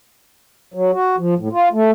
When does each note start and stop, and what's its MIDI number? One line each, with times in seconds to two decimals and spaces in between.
0.74 0.91 54
0.93 1.16 66
1.18 1.34 53
1.38 1.48 45
1.52 1.69 65
1.73 1.91 57